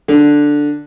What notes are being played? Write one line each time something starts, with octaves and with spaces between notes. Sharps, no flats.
D3